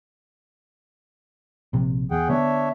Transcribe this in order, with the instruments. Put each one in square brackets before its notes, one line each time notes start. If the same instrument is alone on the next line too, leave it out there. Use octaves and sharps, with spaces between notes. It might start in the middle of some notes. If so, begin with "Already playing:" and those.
[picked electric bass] A#1 C3
[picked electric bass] E2 [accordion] G#4 F#5 G5
[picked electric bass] D3 B3 [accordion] D4 C#5 E5